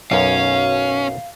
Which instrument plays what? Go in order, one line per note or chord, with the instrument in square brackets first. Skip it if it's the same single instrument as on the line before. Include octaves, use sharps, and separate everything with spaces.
[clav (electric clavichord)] B1 F#2 [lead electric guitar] C#4 [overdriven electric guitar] F5